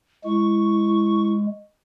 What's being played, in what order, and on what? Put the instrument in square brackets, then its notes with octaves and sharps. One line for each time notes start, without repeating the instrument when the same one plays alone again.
[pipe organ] G#3 [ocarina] E4 [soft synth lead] C#6